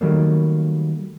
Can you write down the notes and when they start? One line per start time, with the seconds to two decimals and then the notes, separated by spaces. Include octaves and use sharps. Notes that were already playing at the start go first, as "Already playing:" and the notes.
0.01 D#3 F#3 G3 A3 A#3